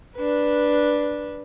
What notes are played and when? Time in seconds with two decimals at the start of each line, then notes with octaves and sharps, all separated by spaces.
0.16 D4 B4